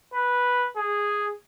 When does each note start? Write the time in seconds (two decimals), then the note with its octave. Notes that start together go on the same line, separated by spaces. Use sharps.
0.13 B4
0.76 G#4